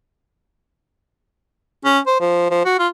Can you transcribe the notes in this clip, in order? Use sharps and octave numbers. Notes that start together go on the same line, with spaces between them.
C#4
C5
F3
F3
F#4
F4